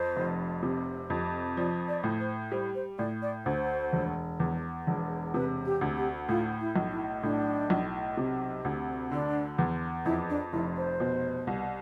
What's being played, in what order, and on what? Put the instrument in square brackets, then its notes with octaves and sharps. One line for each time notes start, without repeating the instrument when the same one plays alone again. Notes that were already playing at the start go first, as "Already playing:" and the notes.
Already playing: [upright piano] F2 [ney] C5
[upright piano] F1
C3
F2
[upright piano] F3 [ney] D5
[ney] D5
[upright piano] A2
[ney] C5
[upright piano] G3 [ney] C5
[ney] C5
[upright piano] A2 [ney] D5
[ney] D5
[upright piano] D2 [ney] C5
[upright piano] E1
E2
E1
[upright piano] C3 [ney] B4
[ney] G4
[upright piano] D2
[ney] G4
[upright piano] A2 [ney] F4
[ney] E4
[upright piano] B1
[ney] E4
[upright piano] A2 [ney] D4
[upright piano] B1
C3
D2
[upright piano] D3 [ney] D4
[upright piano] E2
[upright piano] F2 [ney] E4
[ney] D4
[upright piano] F1 [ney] E4
[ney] C5
[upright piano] B2
C2